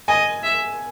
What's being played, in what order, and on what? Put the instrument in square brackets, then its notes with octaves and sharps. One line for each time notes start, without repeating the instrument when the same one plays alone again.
[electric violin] D#5 [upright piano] G#5
[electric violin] E5